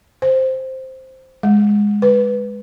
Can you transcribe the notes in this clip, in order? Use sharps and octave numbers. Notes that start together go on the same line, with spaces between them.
C5
G#3
B4